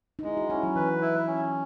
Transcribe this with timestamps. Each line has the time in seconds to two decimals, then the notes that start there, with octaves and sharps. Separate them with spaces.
0.19 D#4
0.23 G#3 E4
0.37 F#4
0.50 C#4 E4
0.63 F#3
0.76 E3 B4
1.01 E4
1.27 C#4